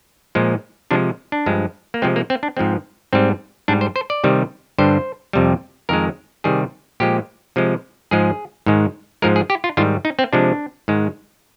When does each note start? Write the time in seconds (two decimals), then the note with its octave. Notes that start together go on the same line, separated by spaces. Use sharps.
0.35 A#2 F3 G#3
0.91 C3 F3 G#3 D4
1.32 D4
1.46 G2 F3 G#3
1.94 A#3
2.02 C3 F3 G#3 C4
2.16 A#3
2.30 C4
2.43 D4
2.57 G#2 F3 G#3 C4
3.13 G#2 G3 C4
3.68 G#2 G3 D4
3.81 C5
3.96 C5
4.10 D5
4.24 C3 D#3 G3
4.78 G2 D3 G3 C5
5.33 F2 C3 G3
5.89 F2 D#3 G#3 A#4
6.44 C3 D#3 G3 G#4
7.00 A#2 F3 G#3 G4
7.56 C3 F3 G#3
8.11 G#2 F3 G#3 G#4
8.66 G#2 D#3 G#3
9.22 G#2 F3 G#3 A#4
9.36 G#4
9.50 G4
9.64 F4
9.77 G#2 D#3 G3 F4
10.05 D#4
10.19 C4
10.33 C3 F3 G#3 D4
10.88 G#2 D#3 G#3